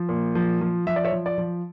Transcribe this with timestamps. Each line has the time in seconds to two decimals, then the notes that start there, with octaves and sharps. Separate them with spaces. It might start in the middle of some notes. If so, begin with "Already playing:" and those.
Already playing: F3
0.09 A#2
0.35 F3
0.61 F3
0.87 F3 E5
0.96 D5
1.04 C#5 E5
1.12 F3
1.26 D5
1.38 F3